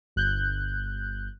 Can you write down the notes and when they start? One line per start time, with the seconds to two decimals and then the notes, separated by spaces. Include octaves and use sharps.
0.16 G1 F#6 G6